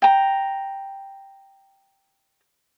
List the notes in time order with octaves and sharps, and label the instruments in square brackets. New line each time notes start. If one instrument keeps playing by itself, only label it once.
[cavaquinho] G5 A#5